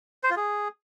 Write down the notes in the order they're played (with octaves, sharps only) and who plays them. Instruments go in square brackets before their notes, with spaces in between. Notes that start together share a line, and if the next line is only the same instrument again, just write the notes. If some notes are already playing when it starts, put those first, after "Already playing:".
[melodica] C5
F4
G#4